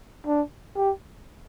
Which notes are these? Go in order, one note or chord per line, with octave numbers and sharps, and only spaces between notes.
D4
G4